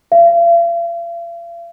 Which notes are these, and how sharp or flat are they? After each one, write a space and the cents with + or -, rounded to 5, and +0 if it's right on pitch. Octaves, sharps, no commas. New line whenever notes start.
F5 -45